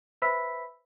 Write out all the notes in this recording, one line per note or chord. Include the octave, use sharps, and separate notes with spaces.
B4 C5 E5 B5 E6 B6